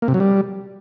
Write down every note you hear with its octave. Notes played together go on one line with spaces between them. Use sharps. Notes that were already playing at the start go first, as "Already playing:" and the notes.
A#3
C3
F#3
G3